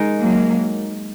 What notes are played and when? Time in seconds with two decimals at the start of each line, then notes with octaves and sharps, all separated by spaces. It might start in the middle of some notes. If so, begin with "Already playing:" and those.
Already playing: G#3 D#4 A#4
0.20 F#3 A#3